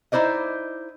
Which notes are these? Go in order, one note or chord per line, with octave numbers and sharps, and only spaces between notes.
D#4 E4 C5 D5 D#5